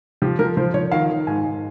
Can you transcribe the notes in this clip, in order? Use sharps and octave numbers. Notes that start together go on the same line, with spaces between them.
F3 G4
F3 A#4
F3 C5
F3 C#5
D#3 F5
D#3
G#2 G#5
G#2